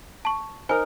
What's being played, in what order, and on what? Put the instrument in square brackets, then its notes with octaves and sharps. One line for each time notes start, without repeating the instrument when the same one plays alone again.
[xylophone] A5 C#6
[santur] D#4 A#4 [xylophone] C5 G#5